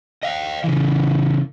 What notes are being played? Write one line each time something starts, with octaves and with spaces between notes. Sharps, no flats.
D#5 F5
C#3 E3